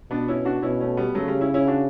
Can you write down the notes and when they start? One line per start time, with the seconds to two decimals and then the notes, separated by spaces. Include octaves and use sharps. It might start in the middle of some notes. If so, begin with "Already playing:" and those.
0.11 B2 B3 D4
0.28 C#4 E4
0.45 D4 F#4
0.62 B2 C#4 E4
0.81 A3 C#4
0.97 G3 B3
1.15 C#3 F#3 A3
1.28 G3
1.41 C#4 E4
1.54 C#4 E4
1.67 D4 F#4